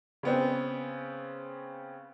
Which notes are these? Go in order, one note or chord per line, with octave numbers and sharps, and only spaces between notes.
C#3 B3 C4